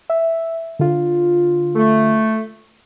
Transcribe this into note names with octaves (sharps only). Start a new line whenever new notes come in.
E5
D3 F4
A3